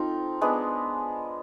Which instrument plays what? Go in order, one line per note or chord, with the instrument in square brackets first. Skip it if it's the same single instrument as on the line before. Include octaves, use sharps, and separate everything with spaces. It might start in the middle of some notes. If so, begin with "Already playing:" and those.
Already playing: [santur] C4 F4 A4 [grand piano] D#4
[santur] G#3 B3 D4